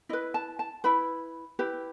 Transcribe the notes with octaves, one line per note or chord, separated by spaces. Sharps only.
E4 B4 D#5
A5
A5
E4 B4 B5
E4 G4 B4